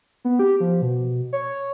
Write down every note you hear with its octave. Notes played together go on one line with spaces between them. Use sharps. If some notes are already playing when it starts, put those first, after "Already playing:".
B3
G4
F3
B2
C#5